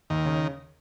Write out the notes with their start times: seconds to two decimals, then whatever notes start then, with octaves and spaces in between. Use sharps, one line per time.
0.10 D#2 D#3
0.26 C#3